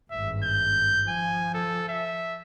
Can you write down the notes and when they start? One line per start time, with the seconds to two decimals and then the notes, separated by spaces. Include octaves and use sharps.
0.11 G#1 G2 E5
0.43 G6
1.08 F3 G#5
1.54 A4
1.89 E5